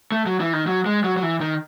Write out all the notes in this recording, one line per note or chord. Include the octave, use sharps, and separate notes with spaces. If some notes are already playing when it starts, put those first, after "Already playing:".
A3
F#3
E3
D#3
F#3
G#3
F#3
F#3
E3
D#3